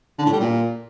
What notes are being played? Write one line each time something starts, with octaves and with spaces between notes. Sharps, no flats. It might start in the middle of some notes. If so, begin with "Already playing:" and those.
D3
A2
G3
A#2